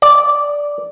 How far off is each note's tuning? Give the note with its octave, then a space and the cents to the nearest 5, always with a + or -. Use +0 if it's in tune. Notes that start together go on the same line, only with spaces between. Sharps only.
D5 -5